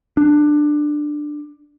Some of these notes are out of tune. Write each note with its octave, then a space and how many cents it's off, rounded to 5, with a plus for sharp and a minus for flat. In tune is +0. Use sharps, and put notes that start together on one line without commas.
D4 +15